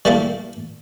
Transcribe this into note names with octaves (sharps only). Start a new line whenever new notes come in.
G3 A3 A#3 E4 A4